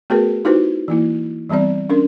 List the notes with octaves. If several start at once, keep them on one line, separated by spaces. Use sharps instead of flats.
A3 B3 F#4 G#4 A#4 B4
D#4 E4 F#4 G4 B4 C5
E3 A#3 E4
E3 G3 B3 C4 D5
C#4 D4 A#4